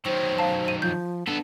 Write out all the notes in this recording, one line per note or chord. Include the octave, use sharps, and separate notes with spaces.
D#3 F#3 C5
F5 A5
D#7
F3 G6
B3 D4 A4